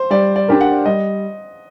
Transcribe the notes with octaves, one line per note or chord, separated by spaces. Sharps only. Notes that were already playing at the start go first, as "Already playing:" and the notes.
Already playing: C5
G3 D5
D5
D4 G4 A#4
F#5
G3 D#5